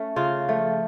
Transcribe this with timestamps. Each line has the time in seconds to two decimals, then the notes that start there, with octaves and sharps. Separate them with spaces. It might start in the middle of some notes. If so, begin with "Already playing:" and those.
Already playing: A3 C#4
0.16 C#3 F4
0.48 F3 A3